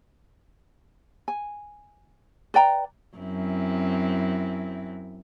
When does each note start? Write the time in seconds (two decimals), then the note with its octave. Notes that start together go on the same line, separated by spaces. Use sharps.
1.28 G#5
2.54 B4 D5 G5 A#5
3.17 F#2 C4 E4